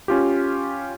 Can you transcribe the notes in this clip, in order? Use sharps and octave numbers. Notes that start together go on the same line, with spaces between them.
C#4 F4 G4